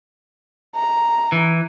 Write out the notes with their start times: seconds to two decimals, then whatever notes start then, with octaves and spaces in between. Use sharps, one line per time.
0.76 A#5
1.32 E3